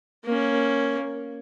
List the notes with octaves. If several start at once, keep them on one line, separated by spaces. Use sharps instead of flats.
A#3 C#4